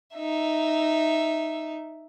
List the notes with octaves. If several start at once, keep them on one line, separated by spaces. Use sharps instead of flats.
D#4 E5